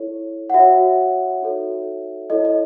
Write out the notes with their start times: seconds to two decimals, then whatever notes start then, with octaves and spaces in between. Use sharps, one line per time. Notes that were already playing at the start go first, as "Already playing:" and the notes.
Already playing: E4 A4 C#5
0.50 F#5
0.54 F#4 C#5 E5
1.42 D#4 F#4 A4 C#5
2.30 E4 A4 C#5 D#5
2.45 D#5